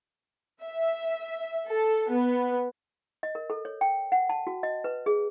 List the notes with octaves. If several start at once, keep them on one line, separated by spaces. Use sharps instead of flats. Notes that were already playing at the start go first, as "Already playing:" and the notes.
E5
A4
B3
D#5
A#4
A4
C#5
G5
F#5
A5
F#4
D#5
B4
G#4